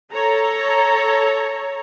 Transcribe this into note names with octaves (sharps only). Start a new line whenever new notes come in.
A4 C#5 A#5